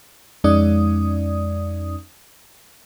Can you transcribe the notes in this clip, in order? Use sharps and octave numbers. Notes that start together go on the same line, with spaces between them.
F2 G#3 C#4 D#4 D5 D#6